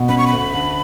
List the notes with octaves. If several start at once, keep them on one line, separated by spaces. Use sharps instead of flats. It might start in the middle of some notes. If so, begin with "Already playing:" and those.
Already playing: B2
C#4 B5
C#6
D2 B5
D3